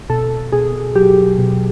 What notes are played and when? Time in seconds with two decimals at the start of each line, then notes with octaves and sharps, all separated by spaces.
0.10 B2 A4
0.52 B2 G#4
0.95 F#3 G4
1.38 B2